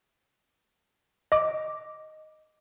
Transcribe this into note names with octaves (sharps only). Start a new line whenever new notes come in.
D#5 D6